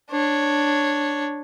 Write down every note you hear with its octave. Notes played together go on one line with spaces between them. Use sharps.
D4 C#5